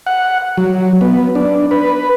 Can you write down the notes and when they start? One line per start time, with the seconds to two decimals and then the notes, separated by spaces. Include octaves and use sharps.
0.07 F#5
0.57 F#3
1.01 B3
1.35 D4
1.71 B4